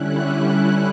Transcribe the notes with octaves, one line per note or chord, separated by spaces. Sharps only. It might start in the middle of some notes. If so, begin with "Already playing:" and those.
Already playing: D3 G3 C#4 E4 F#6
F#6